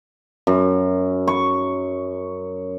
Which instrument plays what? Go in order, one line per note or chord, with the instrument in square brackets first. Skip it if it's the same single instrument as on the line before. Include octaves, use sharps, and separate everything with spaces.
[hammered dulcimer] F#2
C#6